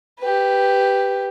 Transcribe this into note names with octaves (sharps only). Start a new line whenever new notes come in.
G4 B4